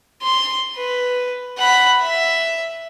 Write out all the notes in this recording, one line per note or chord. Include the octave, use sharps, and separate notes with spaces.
C6
B4
F#5 B5
E5